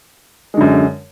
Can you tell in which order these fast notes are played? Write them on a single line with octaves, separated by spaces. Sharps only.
G#3 D3 F#2